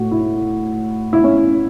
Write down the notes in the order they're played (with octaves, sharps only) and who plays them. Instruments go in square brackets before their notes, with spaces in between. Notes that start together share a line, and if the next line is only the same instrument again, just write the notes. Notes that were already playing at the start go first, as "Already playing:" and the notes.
Already playing: [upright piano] A2 A3 F#4
E4
E4
C#4